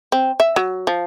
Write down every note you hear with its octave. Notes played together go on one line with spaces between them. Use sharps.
C4
E5
F#3
F3